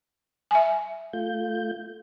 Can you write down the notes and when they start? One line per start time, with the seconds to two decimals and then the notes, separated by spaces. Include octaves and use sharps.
0.51 E5 G#5
1.13 A3 F4 G6